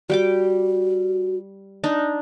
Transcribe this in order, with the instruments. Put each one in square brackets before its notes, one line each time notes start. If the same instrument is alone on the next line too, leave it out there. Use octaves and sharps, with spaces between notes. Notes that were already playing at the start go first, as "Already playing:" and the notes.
[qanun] G3 G5 D6 [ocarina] F#4
[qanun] D4 D#4